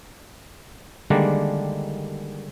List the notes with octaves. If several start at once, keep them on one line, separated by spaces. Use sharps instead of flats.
D3 D#3 G3 G#3 A#3 D4